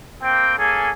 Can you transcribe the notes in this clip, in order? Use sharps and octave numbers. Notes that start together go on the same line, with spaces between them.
A#3 C4 G5
A#3 C#4 G#4 A4 G#5